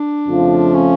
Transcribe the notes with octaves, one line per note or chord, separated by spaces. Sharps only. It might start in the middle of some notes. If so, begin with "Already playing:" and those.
Already playing: D4
F2 C#3 F3 A3 F4
C#4